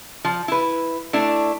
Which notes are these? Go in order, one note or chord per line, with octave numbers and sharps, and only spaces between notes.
F3
E4 B4
A3 D4 E4